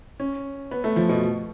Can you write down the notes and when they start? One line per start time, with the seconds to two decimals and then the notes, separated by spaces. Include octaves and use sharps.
0.20 C#4
0.71 B3
0.84 A3
0.96 F3
1.09 B2